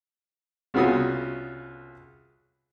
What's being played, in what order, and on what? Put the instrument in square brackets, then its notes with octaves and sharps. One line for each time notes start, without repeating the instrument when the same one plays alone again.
[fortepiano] C2 C#3 B3 F4 F#4 D#6